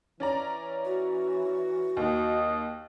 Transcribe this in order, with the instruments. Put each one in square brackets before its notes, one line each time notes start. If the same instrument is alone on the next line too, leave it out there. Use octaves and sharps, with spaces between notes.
[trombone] E3 [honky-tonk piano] C#4 D5 A#5
[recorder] F#4
[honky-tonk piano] D#2 [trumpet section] D#5